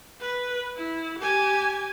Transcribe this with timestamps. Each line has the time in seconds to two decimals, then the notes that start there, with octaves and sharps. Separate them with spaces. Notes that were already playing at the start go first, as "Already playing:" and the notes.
0.21 B4
0.77 E4
1.20 G4 G#5